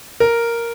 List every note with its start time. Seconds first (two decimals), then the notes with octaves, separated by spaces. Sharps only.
0.20 A#4